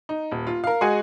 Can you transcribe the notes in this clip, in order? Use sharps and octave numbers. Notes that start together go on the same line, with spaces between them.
D#4
D#1
F4
A#4 F5
G#3 F#4 G#4 D#5 G#5 C#7